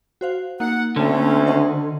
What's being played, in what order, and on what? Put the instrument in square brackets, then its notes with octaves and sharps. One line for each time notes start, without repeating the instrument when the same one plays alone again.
[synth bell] F#4 C5 F5
[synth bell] A#3 D#4 [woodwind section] F#5
[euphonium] D2 [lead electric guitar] D3 [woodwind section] A3 C4 C#4 [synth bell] A#3
[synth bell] C5 D#5 F#5